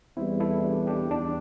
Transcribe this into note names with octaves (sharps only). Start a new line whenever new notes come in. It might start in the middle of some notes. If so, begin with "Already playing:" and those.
E2 E3 G3 C4 E4
E4 A4
D4 G4
D4 G4
E2 D4